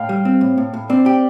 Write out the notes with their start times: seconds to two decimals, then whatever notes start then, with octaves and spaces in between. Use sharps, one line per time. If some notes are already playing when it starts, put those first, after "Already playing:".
Already playing: A2 F5 G5
0.09 G3
0.25 C4
0.41 A2
0.58 A2
0.74 A2
0.89 C4 D5
1.06 G4